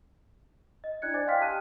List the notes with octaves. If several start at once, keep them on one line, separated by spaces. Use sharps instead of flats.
D#5
D4 E4 D5 F#6 G#6 C#7
C5 D5 D#5 G#5 D6 A6
D#5 F5 G5 C6 F6 B6
G4 A5 D#6 F#6 D#7